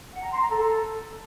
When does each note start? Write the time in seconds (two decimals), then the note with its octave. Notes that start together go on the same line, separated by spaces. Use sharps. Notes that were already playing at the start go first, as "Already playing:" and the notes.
0.13 F#5
0.22 A#5
0.31 C6
0.41 A#5
0.50 A4